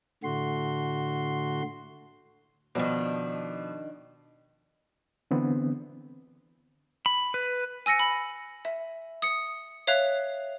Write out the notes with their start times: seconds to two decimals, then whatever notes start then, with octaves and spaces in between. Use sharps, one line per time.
0.24 A2 D3 A3 F#4 C6
2.75 B2 D#3 F3 D4
5.31 D3 E3 B3 C4 D4
7.06 B5
7.34 B4
7.86 G#5 E6 A#6 C#7
7.99 B5
8.65 E5
9.22 D#6 C#7
9.87 C#5 E5 F5 F#6 F7